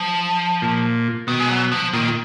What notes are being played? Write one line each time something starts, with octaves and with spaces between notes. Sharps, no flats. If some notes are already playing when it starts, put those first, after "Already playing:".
Already playing: F3
A#2
B2 D#3
G#3
F#3
F3
A#2 D#3